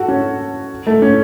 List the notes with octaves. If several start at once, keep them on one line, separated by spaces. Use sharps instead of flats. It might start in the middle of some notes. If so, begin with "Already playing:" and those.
Already playing: F#4 A4
C#4
A3
C#4